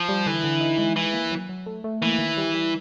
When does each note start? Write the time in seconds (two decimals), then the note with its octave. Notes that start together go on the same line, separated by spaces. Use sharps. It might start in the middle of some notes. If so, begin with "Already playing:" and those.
Already playing: F3
0.09 G3
0.26 D3 E3
0.44 D3
0.61 D#4
0.78 G#3
0.96 E3 B4
1.13 A#3
1.31 F#3
1.49 F#3
1.66 A3
1.84 A3
2.02 E3 A#3
2.19 D#3
2.37 G3
2.54 G3